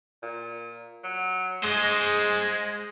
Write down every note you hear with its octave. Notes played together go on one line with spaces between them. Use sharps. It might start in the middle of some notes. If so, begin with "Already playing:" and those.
A#2
F#3
G#3 G#4 C5 D#5